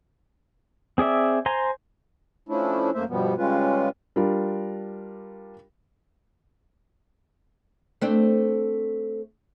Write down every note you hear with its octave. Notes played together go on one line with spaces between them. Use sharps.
C4 G#4 D5 E5
C5 G#5 A#5 C6
F3 A3 C#4 D4 E4
F#2 A3 A#3 C5 E5
G2 B2 F3 G3 B3
C#3 G3 G#3 C#4 F4 B4
G3 D4 F4 A#4
A3 C4 D4